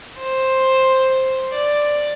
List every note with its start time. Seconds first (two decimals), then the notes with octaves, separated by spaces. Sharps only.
0.17 C5
1.52 D5